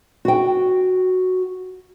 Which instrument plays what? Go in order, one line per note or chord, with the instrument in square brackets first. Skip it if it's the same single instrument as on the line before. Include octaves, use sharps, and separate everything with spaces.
[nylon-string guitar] F#4 G5